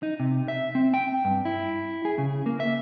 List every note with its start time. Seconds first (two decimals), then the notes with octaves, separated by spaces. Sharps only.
0.03 D#4
0.20 C3
0.48 E5
0.75 C4
0.94 G5
1.25 G2
1.45 E4
2.05 G#4
2.18 C#3
2.46 A#3
2.60 E5